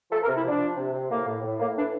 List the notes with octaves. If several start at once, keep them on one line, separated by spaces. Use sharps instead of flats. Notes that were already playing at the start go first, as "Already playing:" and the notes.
F3 A4
A#4
C3
E4
F3 D4
F3
C3
C3
A2 A#3
A2
A2
A2 A#3
E3 D4